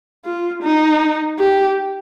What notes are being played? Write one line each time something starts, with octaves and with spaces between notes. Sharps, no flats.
F4
D#4
G4